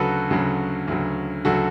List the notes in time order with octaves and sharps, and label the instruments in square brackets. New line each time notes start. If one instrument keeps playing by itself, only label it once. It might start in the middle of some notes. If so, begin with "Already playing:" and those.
Already playing: [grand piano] D2 C#3 F#3 F#4 A4 B4
D2 C#3 F#3
D2 C#3 F#3
D2 C#3 F#3 F#4 A4